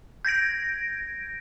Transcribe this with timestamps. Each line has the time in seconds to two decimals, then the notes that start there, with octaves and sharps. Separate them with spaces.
0.25 G6 G#6 A#6 D7